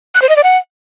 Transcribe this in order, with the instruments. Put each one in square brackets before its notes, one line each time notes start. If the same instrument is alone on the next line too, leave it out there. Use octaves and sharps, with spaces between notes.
[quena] F#6
C5
D#5
D5
F#5